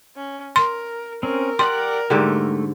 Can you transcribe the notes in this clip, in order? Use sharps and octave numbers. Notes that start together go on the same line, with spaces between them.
C#4
A#4 C6
C4 C#4 A#4
G4 D5 F#5 C6
G#2 D3 G3 A3